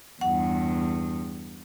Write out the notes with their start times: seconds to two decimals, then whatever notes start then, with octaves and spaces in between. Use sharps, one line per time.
0.21 E2 G2 F#5